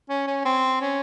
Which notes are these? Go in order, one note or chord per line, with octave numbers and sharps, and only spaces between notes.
C#4
C#4
C4
C#4